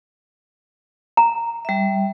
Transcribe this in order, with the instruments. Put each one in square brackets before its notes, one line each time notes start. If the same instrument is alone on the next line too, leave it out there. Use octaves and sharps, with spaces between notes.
[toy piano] A#5
[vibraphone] G3 E5